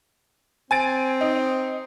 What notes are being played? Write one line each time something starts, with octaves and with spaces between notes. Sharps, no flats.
C4 G#5 A6 D7
D#4